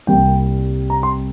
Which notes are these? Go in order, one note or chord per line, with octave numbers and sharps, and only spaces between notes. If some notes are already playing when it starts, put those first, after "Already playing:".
C2 C3 G3 A#3 G5
A#5
C6